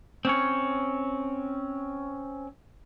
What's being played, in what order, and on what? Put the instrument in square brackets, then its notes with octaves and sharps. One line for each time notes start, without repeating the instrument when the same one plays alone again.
[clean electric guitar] C4 C#4 C#5